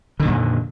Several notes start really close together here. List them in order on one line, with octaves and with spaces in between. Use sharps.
D3 D#3 A#2 F2